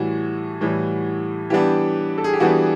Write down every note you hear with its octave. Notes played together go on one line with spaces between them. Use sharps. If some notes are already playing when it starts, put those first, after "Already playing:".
Already playing: A2 E3 G3 F#4
A2 E3 G3
E3 G3 B3 D4 G4
A4
G#4
G4
E3 G3 B3 D4 F#4